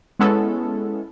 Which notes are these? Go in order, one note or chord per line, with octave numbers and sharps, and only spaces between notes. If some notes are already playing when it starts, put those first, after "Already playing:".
G#3 B3 C#4 E4 A4